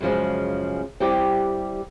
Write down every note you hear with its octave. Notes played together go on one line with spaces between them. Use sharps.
F#2 C#3 F3 G#3
G3 C4 E4 G4